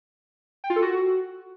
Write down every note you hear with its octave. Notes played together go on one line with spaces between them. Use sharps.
G5
F4
A4
F#4